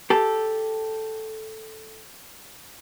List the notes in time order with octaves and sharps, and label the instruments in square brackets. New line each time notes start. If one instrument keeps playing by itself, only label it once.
[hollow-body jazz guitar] G4 A4